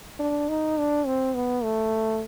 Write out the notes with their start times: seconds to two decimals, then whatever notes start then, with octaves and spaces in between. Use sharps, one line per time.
0.19 D4
0.49 D#4
0.78 D4
1.06 C4
1.34 B3
1.64 A3